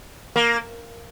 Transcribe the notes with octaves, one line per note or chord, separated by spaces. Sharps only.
A#3